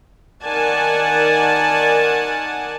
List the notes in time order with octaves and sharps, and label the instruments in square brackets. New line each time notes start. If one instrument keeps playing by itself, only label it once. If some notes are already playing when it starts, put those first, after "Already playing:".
[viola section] D#3 A#4 D5 F#5 G#5 A5